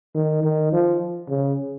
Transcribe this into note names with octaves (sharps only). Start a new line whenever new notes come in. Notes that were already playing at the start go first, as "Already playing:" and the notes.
D#3
D#3
F3
C#3